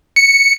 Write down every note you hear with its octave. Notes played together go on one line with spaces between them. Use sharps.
C#7